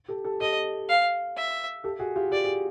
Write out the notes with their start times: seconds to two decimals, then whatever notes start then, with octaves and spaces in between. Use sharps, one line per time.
0.08 G4 A4
0.25 G4 A4
0.40 G4 A4 D#5
0.89 F5
1.36 E5
1.84 G4 A4
1.99 F#4 G#4
2.16 F4 G4
2.31 G4 D5
2.45 G#4